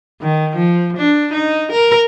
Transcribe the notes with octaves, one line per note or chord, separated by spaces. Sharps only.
D#3
F3
D4
D#4
A#4